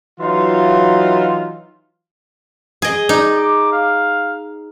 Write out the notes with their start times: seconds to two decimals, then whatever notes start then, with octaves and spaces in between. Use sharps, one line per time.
0.19 E3 F#3 D#4 F4
2.82 G#4 D#5
3.09 D#4 D5
3.37 D6
3.72 F5